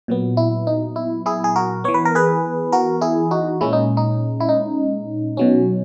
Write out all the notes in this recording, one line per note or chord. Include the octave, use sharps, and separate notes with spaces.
A#2 F#3 B3
E4
D#4
E4
E4 G#4
G#4
F#4 A#4
E3 B3 C#5
B4
A#4
G#4 B4
F#4 A#4
E4 G#4
D#4 F#4
A#2 G#3 C#4 E4
D#4
D#4
E4
D#4
B2 F#3 C#4